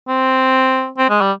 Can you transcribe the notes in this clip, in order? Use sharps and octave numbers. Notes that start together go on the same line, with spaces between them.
C4
C4
G#3
G3